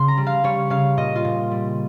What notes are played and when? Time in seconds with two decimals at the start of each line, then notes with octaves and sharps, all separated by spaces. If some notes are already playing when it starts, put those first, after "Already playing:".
Already playing: C#3 C6
0.08 A#5
0.17 G3
0.27 F5
0.44 G3 C#5
0.70 C#3 F5
0.97 A#2 D#5
1.15 F4
1.24 A#2
1.51 G3